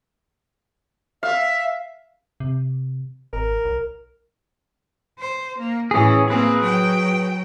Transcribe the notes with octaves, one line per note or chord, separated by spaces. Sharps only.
E5 F5
C3
G#1 A#4
B1
C5
A#3
A2 E3 C#4 G#4
A#3 C4 G#4 B4
F#3 G5